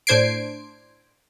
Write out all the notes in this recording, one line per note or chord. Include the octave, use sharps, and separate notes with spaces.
A2 D4 C5 G#6 C7 D7